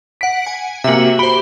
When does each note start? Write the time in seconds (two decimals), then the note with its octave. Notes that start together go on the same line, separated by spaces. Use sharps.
0.21 F#5 B6 D7
0.47 G#5
0.84 C3 A#3 F#4 E5
1.19 G4 C5 B5